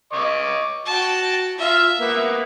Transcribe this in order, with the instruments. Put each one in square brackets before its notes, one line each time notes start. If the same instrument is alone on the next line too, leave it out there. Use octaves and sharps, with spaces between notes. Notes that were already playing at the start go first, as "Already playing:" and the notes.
[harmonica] D#5 C#6 D6
[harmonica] F#4 [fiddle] G5 A5
[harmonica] F4 [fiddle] E5
[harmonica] A#3 B3